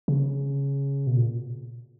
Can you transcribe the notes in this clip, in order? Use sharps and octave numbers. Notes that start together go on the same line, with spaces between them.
C#3
B2
A#2